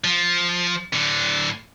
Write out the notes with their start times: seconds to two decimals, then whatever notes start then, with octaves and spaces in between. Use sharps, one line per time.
0.04 F3
0.93 A2 D3